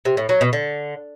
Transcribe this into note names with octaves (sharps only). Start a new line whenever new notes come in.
C3
A2
F#3
B2
D3